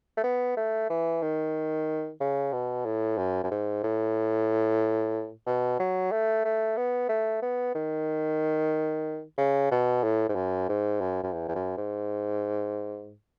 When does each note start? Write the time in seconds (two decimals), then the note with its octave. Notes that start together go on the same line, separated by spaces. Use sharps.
0.17 A3
0.24 B3
0.57 A3
0.90 E3
1.22 D#3
2.20 C#3
2.53 B2
2.85 A2
3.17 F#2
3.44 F#2
3.51 G#2
3.83 A2
5.47 B2
5.79 F#3
6.12 A3
6.45 A3
6.77 B3
7.09 A3
7.42 B3
7.75 D#3
9.38 C#3
9.71 B2
10.03 A2
10.29 G#2
10.35 F#2
10.69 G#2
11.01 F#2
11.23 F#2
11.33 E2
11.48 E2
11.55 F#2
11.77 G#2